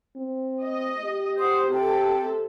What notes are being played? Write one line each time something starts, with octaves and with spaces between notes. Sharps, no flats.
C4
D#5
G4
C5 F#5 D6 D#6
C3 A4 G5